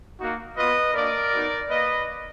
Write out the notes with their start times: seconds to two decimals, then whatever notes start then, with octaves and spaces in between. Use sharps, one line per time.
0.19 A#3 D#4 F#4
0.56 B3 F4 B4 D#5
0.94 A#3 D4 F#4 A#4 D5
1.32 B3 D#4 F#4
1.70 A#3 B4 D#5